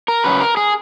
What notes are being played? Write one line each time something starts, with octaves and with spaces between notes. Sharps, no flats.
A#4
F#2 C#3 F#3 B4
A#4
G#4